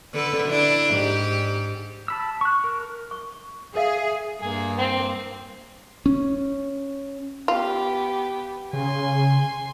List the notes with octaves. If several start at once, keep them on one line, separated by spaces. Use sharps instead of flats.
D3 A4 B4
D4 E4
G#2 G4
A5 B5 E6
C#6 F#6
A#4
C#6
G#4 A#4 E5 F5
G2 A#3 G#4
C4
C#4
B3 F4 G4
C#3 G#5 C6